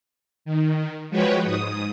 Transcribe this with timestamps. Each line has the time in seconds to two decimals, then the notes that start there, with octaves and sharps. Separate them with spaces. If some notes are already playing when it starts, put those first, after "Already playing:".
0.45 D#3
1.10 F3 G#3 F#4 B4 C#5 G5
1.44 G#2 D#6